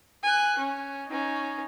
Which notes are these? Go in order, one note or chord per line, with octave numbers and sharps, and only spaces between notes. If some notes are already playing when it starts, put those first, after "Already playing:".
G#5 F#6
C#4
C#4 D#4